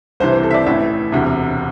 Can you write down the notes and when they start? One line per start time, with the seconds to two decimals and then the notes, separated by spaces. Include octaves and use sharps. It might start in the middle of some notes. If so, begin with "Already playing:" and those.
0.20 C2 C3 E3 C5
0.32 C5
0.43 A4
0.51 E5
0.54 D5
0.66 A1 A2 E3 E5
1.12 E1 D2 C3